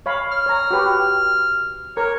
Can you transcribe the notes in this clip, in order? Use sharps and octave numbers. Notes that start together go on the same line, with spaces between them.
C#5 F5 B5
F6
C#5 A#5
F#4 G4 B4
A#4 C#5